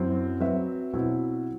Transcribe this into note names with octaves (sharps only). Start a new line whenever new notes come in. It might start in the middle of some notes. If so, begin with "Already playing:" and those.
Already playing: F#2 F#3 C4 E4
F#3 C4 F#4 B4 E5
B2 F#3 C4 E4